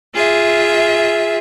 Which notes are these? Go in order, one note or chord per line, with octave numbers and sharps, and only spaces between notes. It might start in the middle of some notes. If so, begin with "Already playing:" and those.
F4 G#4 E5